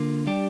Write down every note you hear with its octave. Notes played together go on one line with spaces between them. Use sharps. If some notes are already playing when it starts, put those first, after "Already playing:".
Already playing: D3 A#3 F4
G3 D4 G4